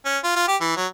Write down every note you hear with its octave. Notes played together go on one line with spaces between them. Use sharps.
C#4
F4
F4
G4
E3
F#3